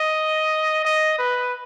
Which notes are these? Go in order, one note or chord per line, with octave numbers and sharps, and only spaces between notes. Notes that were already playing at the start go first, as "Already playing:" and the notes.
Already playing: D#5
D#5
B4